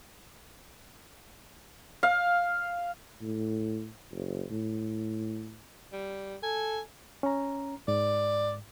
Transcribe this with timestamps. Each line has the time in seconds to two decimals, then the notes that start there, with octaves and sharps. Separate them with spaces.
2.03 F5
3.22 A2
4.11 F#1
4.51 A2
5.93 G3
6.43 A4 G#5
7.23 C#4 A#5
7.88 G#2 D5